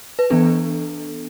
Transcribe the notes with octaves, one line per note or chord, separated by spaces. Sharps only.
B4
E3 B3 D4 A4